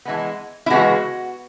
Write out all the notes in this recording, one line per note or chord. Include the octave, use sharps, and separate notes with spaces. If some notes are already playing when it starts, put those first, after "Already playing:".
E3 G#3 B3
E4
C#3 E3 G#3 B3 F#4